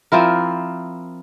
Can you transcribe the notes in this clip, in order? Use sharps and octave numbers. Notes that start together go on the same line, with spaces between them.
F3 C4 E4 A#4